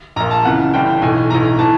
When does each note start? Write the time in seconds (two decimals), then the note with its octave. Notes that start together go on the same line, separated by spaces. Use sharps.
0.16 A#1 A#2 A#5
0.31 A5
0.45 C#2 C#3 E3 F#5
0.74 G1 G2 E3 G5
1.01 B1 A2 E3 G#5
1.30 B1 A2 E3 A#5
1.59 A2 E3 A5